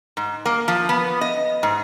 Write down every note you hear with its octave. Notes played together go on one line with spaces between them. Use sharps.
G#2
A#3
F3
B3
D#5
G#2